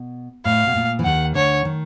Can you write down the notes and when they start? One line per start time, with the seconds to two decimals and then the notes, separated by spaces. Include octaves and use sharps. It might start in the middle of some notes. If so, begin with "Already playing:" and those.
Already playing: B2
0.45 A2 F5
0.67 B2
0.76 A#2
0.99 E3
1.05 D#2 D#3 F#5
1.35 D2 D3 C#5
1.65 D#3